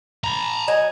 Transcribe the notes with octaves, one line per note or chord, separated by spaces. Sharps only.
A#5 B5
F#3 D#5 G#5